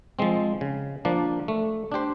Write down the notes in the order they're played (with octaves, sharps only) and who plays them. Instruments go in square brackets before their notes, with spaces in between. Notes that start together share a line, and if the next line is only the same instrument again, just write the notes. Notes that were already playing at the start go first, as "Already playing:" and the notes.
[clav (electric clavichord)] F3 G#3 C4
C#3
F3 A#3 D4
A3
D4 G4 C5